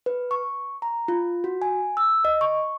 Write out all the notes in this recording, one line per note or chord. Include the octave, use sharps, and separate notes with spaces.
B4
C#6
A#5
F4
F#4
G#5
E6
D#5
C#6